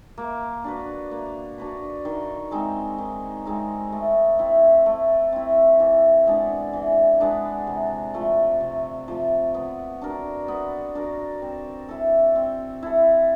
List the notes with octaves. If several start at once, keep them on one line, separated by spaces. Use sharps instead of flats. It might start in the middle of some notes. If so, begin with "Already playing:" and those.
A#3
D4 F#4 B4
A#3
D4 F#4 B4
D#3
G#3 C4 D#4
D#3
G#3 C4 D#4
A3
C4 E4
A3
C4 E4
E3
G#3 B3 D4
E3
G#3 B3 D4
C3
F3 A3
C3
F3 A3
B3
D4 F#4 A#4
B3
D4 F#4 A#4
C4
E4 A4
C4
E4 A4